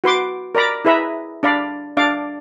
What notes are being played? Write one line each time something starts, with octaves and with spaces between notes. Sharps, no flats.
F#4 B4 C6 D6
A#4 D5 A#5 B5 D6
E4 G#4 B4 E5 A#5 B5
D4 D5 F5 B5
D4 D5 F5 D6